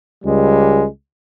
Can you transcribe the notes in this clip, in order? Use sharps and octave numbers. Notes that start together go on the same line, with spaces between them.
C#2 G3 G#3